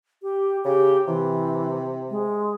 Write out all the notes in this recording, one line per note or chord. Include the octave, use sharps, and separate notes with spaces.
G4
C#3 G4
C3 E3
G#3